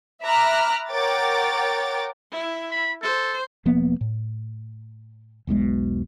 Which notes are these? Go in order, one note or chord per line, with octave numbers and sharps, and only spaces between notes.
E5 A#5 B5 D6 F6 F#6
A#4 C#5 F#5 G5 D6 A6
E4
B5
A4 C5
E1 F3 A#3 B3
A2
E1 B1 B2 G#3